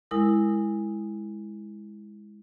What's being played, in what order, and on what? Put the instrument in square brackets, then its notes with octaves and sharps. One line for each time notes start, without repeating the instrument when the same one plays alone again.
[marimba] G#3 E4 A#4 D#6